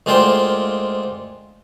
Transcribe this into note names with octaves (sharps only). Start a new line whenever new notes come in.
D2 G#3 A#3 F4 C5 G5